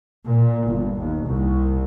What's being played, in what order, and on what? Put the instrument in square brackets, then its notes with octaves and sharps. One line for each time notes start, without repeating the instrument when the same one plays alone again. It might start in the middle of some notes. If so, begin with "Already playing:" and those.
[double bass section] A#2
G1
D#2
C2